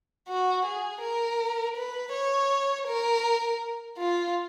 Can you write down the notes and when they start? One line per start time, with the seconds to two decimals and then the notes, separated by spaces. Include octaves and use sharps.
0.28 F#4
0.65 G#4
1.01 A#4
1.76 B4
2.13 C#5
2.87 A#4
3.97 F4